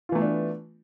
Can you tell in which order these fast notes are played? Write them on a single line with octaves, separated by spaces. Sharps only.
F4 E3 A3 B3 D4